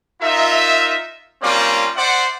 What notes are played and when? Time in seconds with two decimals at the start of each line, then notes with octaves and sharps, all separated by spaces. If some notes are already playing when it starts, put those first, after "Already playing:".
0.21 D#4 F4 A#4 E5
1.42 G3 A#3 C4 C#4 F4 D5
1.96 C5 D5 E5 F#5